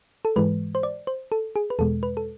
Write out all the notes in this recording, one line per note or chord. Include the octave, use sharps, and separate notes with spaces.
A4
G#2 E3 G#3 B4
C5
D5
C5
A4
G#4
B4
E2 B2 G#3 A4
B4
A4